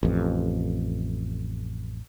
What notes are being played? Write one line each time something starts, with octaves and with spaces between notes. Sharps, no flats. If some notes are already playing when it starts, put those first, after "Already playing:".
A1 F2